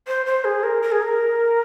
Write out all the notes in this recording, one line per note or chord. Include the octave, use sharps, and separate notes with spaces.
C5
C5
G#4
A#4
A#4
G#4
A#4